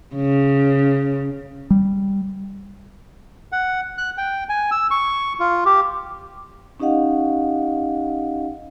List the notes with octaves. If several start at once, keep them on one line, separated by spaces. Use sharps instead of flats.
C#3
G3
F#5
F#6
G5
G#5
E6
C#6
F4
G4
C#4 D#4 G4 D#5 F5 F#5